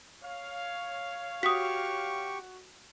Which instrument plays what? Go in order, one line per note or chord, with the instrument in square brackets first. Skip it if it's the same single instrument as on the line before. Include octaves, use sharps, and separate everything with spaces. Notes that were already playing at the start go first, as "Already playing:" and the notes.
[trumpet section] C#5 F5
[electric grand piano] F#4 [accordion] G4 C#6 [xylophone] D#6 B6